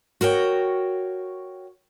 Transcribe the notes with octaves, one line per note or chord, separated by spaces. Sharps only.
F#4 A#4 C#5 G5